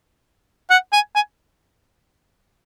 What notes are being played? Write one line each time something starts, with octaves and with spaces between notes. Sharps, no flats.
F#5
G#5
G#5